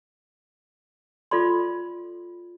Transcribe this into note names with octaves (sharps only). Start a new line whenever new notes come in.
F4 A4 D5 B5 C6